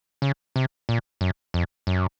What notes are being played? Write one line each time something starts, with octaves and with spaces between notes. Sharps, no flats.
C#3
C3
A#2
F#2
F2
F#2